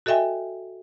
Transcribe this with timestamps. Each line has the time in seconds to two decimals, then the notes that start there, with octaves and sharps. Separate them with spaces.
0.06 F#4 A4 D#5 E5 G5 G#5